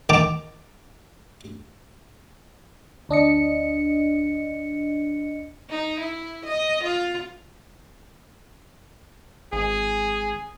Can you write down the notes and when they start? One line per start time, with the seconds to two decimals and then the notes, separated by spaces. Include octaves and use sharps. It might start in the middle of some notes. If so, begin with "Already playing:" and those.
0.09 D#3 G5 A5 A#5 D6
3.09 D2 D4 D#5 C#7
5.70 D#4
6.00 E4
6.45 D#5
6.83 F4
9.53 G#1 G#4